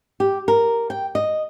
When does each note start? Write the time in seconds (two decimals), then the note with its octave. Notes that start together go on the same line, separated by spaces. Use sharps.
0.20 G4
0.48 A#4
0.90 G5
1.15 D#5